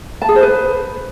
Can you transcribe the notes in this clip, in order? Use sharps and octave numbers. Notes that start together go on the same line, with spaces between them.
A5
G#4
C5
B4